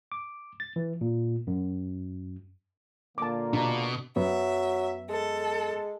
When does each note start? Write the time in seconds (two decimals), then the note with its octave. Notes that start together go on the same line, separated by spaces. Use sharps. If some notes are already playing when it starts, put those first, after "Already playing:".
0.12 D6
0.60 A6
0.76 E3
1.01 A#2
1.47 F#2
3.18 A#2 D3 A#3 A5 D6
3.53 B2 D4 A#5
4.16 F#2 F#3 B3 E5
5.09 G#3 A4